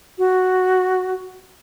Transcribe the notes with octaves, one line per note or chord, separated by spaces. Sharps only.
F#4